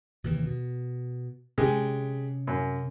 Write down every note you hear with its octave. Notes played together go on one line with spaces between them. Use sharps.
D#2 C3 E3
B2
C3 G#3 C#4 G4
F#2